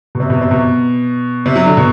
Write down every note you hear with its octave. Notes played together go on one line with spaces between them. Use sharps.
B2
C3
B2
C3
B2
C3
F#3
D3
B2